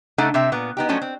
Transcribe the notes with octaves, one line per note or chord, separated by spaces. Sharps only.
C#3 A3 D4 D#4 A4 F#5
C3 C4 E5
A#2 B3
B3 D#4 G4
F3 F#3 A3 C#4 D4 F#4
C4